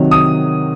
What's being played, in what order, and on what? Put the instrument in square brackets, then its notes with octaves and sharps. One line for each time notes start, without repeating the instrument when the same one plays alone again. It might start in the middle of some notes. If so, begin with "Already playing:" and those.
Already playing: [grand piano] C3 D#3 F#3
D#6